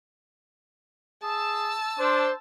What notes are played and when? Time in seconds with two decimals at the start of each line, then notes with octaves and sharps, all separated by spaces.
1.23 G#4 A5 E6
1.99 D4 C5